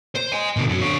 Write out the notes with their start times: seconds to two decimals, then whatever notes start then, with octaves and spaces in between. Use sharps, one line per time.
0.15 C5
0.32 D#5 G#5
0.57 B2 D3
0.70 F#2 F#3
0.82 D3 C#5